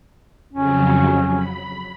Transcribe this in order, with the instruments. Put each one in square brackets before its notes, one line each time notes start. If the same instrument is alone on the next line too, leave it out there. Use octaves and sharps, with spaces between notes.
[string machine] F2 C#3 F#3 [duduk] C#4
[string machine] B5